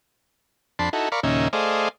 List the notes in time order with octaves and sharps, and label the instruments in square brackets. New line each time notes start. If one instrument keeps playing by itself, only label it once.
[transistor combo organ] F2 D4 A5 B5 C6
D#4 E4 F#4 A4
A#4 D5 F5 B5 C#6
D#2 A#2 C#3 C#4 D#4 E5
A3 G#4 C5 D5 D#5 F5